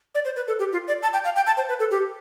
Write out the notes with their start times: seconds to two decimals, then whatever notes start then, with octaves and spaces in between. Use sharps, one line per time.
0.15 D5
0.25 C5
0.36 B4
0.48 A4
0.59 G4
0.73 F4
0.88 D5
1.03 A5
1.13 G5
1.24 F5
1.36 G5
1.47 A5
1.57 C5
1.69 B4
1.80 A4
1.91 G4